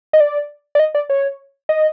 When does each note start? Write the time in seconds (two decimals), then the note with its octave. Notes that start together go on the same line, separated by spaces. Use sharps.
0.13 D#5
0.20 D5
0.75 D5
0.79 D#5
0.95 D5
1.10 C#5
1.69 D#5